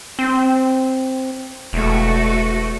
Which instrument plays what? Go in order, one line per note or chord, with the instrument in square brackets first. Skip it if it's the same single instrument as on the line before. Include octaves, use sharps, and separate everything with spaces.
[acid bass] C4
[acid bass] E1 [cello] A3 F#4